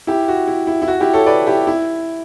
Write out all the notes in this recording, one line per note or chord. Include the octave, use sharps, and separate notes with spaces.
E4 G4
F#4
E4
E4
E4
F#4
E4 G4
A4 C#5
B4 D5
E4 G4
E4